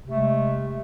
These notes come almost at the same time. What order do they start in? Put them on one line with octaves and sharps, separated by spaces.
C3 A3 G#3